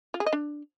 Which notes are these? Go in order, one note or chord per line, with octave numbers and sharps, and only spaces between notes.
F4
G#4
D#5
D4